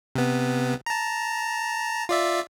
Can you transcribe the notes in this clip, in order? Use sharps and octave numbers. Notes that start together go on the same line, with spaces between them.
C3 B3
A5 A#5
F4 D5 E5